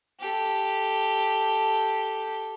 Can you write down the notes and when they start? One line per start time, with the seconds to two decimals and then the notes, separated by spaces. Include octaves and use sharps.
0.20 G4 A4